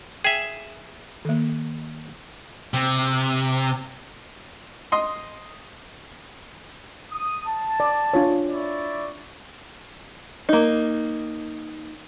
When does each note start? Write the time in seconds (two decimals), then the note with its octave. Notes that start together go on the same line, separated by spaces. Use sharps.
0.24 G#4 E5 G5
1.25 D#3 A#3
2.74 C3
4.92 D#5 C6
7.10 D#6
7.45 A5
7.80 D5
8.14 D4 F4 C#5
8.49 E4 D5 C#6
10.49 A#3 D#4